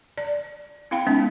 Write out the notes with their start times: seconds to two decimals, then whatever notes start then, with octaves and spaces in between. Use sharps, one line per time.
0.18 D5
0.91 C4 E4 F5 G5 B5
1.06 G#3 B3 C#4 D#4